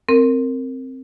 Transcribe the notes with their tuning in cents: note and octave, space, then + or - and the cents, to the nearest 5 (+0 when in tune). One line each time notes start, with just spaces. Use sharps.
C4 +0 A#4 -15